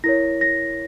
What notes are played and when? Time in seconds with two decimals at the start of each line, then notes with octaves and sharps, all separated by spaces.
0.04 E4 A#4 C#5 A#6
0.41 A#6